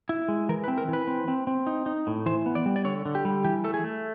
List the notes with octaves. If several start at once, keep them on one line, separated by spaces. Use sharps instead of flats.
E4
G#3
E3 A#4
B4
C4
A#4
E3 B4
C4
C4
C4
D#4
D#4
A2
E3 C5
B3
D5
G3
D5
D3 C#5
D3
G4
G3
E3 G4
A3 A4
G#4
A3